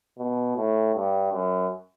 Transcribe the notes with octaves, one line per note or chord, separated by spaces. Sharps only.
B2
A2
G2
F#2